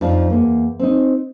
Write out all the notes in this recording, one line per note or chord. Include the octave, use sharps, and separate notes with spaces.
F2 F3 D4 D#4
E2 A#3
C4 D#4